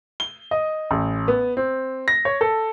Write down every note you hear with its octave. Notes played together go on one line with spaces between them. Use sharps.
G7
D#5
A1
B3
C4
A#6
C#5
A4